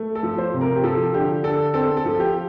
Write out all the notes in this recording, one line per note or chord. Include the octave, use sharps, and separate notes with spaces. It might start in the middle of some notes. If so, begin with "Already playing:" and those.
Already playing: A3
A4
F3
C5
C3
A#4
G4
F3 A4
D3 G4
D3 A4
C4 A4
A4
F3
G4